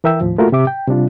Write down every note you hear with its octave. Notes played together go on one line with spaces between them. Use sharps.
E3 A#4 E5 G5 E6
D#2 A2 F3
A3 A#3 F4 F#4 A#4
C3 G4 E5 D6
G5
C3 G3 D4 F4